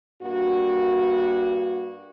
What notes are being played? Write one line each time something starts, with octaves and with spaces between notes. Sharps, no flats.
G2 A#3 F#4